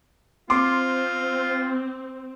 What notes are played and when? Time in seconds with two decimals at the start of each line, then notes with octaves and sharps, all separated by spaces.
0.50 C4 F4 C6 D6